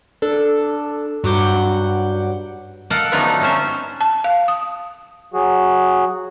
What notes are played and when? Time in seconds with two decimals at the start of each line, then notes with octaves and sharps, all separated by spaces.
0.22 D4 A4
1.24 G2 F#3 F#5 D6 G6
2.90 A4 A#4 D#5 F5 F#5
3.12 D3 F3 F#3 A3 B3 D#4
3.41 F#3 C4 C#4 C5 E5
4.01 A5
4.24 F5
4.48 D#6
5.33 F#3 F#4 G#4